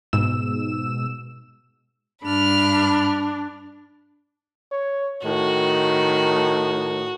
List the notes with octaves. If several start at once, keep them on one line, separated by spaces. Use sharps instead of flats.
G#2 B2 E6 E7
G2 D4 B5 F6
C#5
A2 D#3 F#4